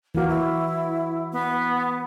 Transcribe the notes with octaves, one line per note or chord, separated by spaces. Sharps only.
E3 A#3 F#4
E4
B3